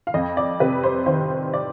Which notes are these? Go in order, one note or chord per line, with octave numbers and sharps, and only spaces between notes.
F5
F2 D#5
D5
C3 B4
C5
D#3 C5
D5